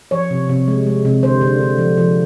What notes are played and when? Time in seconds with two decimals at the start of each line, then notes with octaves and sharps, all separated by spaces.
0.11 F3 C#5
0.31 C3
0.49 C3
0.68 G#3
0.86 G#3
1.05 C3
1.23 D3 C5
1.41 D3
1.61 D3
1.78 F3
1.97 F3